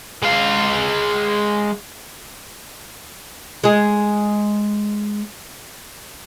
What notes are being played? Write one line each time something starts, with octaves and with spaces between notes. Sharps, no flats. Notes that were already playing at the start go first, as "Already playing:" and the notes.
G#3 F5
G#3 G#4